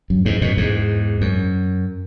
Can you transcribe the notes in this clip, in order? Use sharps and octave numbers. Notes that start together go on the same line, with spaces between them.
F#2
E2 G#2
F#2 B2
E2 G#2
F#2